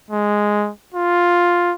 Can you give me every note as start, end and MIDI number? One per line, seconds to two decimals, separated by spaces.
0.11 0.71 56
0.95 1.74 65